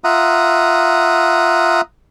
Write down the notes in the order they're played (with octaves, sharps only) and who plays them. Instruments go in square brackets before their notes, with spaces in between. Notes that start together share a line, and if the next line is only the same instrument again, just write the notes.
[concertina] F4 E5 F#5 A#5 D#6